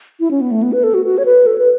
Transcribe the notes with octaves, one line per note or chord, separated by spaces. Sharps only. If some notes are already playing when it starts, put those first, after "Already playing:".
E4
C#4
B3
A3
B3
B4
A4
F#4
F#4
C#5
B4
A4
B4